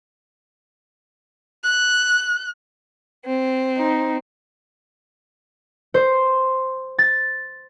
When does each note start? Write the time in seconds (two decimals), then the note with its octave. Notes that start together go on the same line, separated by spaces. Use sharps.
1.64 F#6
3.25 C4
3.77 D#4
5.94 C5
6.98 A6